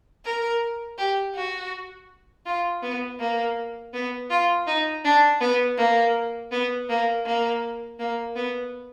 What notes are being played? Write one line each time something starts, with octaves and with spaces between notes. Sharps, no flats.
A#4
G4
F#4
F4
B3
A#3
B3
F4
D#4
D4
B3
A#3
B3
A#3
A#3
A#3
B3